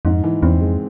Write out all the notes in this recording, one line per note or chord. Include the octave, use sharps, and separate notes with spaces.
F2 G#2
E3
E2 C4
F2 G#3